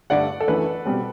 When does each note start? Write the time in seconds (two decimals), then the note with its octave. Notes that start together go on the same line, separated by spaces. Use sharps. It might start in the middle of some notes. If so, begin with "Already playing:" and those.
0.10 G2 D3 A3 D5 F#5
0.40 A4
0.48 F#2 E3 A3 D4 B4
0.85 B2 G3 C4